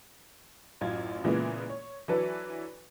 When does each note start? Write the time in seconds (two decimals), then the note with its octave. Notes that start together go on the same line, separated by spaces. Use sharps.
0.81 A1 F#2 F4 G#6
1.24 A#2 C#3 E3 G#3 A#3 B3
1.69 C#5
2.08 E3 F#3 D4 A4 B4